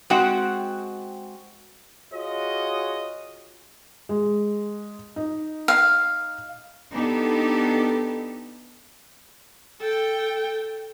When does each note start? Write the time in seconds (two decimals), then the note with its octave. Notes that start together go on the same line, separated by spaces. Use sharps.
0.10 G#3 C4 F#4 F#5 G5
2.13 F4 F#4 G#4 C#5 D#5
4.09 G#3
5.16 D#4
5.68 F5
6.92 B3 D4 D#4 G4 A4
9.80 A4 G5